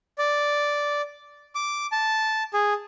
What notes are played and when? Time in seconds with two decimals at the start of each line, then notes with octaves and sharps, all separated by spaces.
0.18 D5
1.55 D6
1.92 A5
2.53 G#4